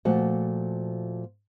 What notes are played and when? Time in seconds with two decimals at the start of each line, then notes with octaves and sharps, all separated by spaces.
0.05 A#2 F3 A3 F#4 F#5